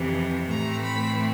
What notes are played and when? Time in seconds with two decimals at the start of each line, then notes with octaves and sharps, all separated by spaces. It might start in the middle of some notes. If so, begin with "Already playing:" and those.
Already playing: F2 C3 E3
0.51 A2 E3 A3 C4 A#5
0.84 B5